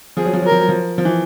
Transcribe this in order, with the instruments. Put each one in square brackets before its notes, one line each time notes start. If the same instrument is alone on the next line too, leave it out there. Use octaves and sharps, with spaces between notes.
[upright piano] F3 [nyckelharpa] G#4
[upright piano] F#3
F3
F#3
[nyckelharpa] A#4
[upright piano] F3
F#3
F3
F3
E3